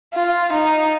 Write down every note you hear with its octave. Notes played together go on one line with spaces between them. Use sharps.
F4
D#4